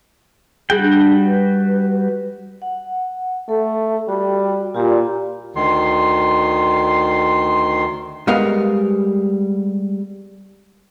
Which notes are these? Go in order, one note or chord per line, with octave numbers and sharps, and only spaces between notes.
G3 F#4 G#4 G5
D4
B4
F#5
A3 A4
G3 F#4 G5
A#2 F4 G4 D5
D2 D#3 C6
G3 G#3 B3 A#4 F5